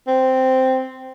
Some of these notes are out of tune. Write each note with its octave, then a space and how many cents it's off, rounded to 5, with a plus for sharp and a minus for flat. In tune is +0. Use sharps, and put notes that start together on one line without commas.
C4 -5